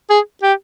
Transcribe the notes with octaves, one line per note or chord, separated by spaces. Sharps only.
G#4
G4